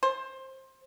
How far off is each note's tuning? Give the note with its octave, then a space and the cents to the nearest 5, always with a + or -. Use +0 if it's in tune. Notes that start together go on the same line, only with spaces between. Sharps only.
C5 +20